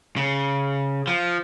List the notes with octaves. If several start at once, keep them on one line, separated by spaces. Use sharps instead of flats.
C#3
F3